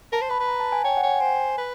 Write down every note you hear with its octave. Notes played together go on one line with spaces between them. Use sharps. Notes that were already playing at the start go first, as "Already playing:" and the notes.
A#4 A5
C5
B4 B5
B4 B5
A#5
A5
G#5
C#5 G5
F#5
C#5 G#5
G5
C5 G#5
B4